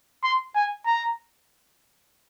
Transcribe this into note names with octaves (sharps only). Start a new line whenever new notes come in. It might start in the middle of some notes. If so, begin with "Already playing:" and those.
C6
G#5
A#5